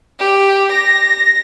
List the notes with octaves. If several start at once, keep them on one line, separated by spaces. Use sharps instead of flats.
G4
A#6